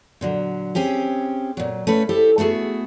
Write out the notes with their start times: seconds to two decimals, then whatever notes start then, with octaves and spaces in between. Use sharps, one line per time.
0.21 A#2 D3 F#3
0.75 C4 C#4 G4 G#4
1.57 A#2 F#3
1.87 A3 C#4 B4
2.09 E4 G4 A4 C5
2.38 A3 B3 F#4 G#4